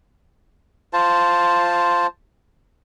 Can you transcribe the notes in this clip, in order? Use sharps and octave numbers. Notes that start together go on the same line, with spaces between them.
F4 C5 A5